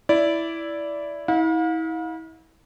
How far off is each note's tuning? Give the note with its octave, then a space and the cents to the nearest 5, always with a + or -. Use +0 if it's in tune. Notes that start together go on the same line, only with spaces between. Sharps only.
E4 +0 D5 -15
E4 -35 F5 +40